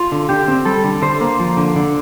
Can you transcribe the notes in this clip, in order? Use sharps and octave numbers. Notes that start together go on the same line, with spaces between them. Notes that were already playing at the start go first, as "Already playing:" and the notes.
Already playing: F4
D3
D3 G4
C4
G3 A4
D3
D3 C5
A#3
F3
D3
D3